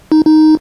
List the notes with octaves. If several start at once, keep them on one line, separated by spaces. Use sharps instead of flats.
D#4
D#4